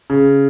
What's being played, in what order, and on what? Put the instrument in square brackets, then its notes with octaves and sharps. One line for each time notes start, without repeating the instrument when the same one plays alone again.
[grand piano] C#3